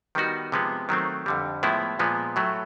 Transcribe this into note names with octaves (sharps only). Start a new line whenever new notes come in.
D#3 G3 B3 D#4 F#4
C3 F3 G#3 B3
D#3 F#3 A3 C4
F2 D3 G3
A2 F3 G#3 B3 E4
A#2 F3 G#3 B3
A2 F#3 A3